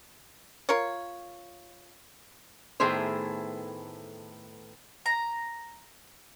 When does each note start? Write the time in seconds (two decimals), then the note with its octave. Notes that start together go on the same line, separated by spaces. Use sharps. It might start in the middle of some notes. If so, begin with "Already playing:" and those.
0.69 F4 A#4 C#5
2.80 A2 D#3 A3 B3 G#4 C5
5.06 A#5